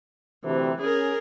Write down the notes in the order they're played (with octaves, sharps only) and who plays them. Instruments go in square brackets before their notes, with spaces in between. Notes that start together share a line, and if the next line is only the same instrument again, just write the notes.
[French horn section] D2 C3 [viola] E3
[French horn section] C#4 [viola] G#4 A#4